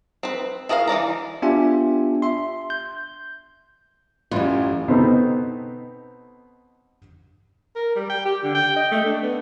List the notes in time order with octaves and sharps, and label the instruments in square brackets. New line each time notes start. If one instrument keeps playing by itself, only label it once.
[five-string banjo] C4 B4
E4 G#4 A#4 D5 F5
E3 D4 D5 A#5
[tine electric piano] B3 D4 F4 G4 E5 G#5
E5 C6
G6
[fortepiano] A1 F#2 G3 [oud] C#4 F4
[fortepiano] B2 B3 C4 D#4 A4
[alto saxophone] A#4
G3
G5
G4
D3
G5
D#5
A3
D4
B3